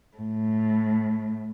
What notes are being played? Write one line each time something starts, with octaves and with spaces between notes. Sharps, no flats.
A2